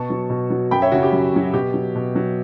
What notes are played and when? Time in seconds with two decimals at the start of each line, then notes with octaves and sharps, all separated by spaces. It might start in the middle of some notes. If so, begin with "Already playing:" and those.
Already playing: B2 A5 C#6
0.10 F#3
0.30 B2
0.50 F#3
0.71 F#2 G5 B5
0.82 C#5 E5
0.92 C#3 F#3 F#4
1.03 G4
1.13 F#2
1.33 C#3 F#3
1.53 B2 G4
1.74 F#3
1.96 B2
2.16 F#3